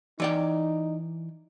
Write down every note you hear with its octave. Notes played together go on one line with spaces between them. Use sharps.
E3 D#4 D5 G5